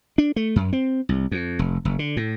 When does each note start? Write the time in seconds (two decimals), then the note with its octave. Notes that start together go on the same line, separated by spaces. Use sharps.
0.18 D4
0.36 A3
0.56 F#2
0.73 C4
1.09 C2
1.31 F2
1.59 F1
1.85 F#1
1.99 D3
2.17 A2